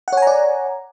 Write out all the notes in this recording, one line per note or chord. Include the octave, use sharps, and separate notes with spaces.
C#5 D5 F#5 G#5 A#5